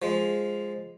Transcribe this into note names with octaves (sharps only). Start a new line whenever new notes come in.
F3 G#3